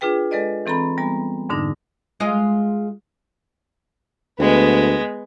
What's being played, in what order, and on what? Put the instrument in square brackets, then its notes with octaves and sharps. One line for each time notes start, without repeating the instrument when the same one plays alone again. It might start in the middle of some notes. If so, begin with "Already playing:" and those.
[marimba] D4 F4 G#4 B4 G5
G#3 A4 B4 D5 D#5
E3 C4 A4 A#5 B5
G3 B3 A#5
F2 G#2 D3 D4 D#4 A#6
[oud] G#3 F4 D#5
[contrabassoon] D2 [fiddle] G#3 B3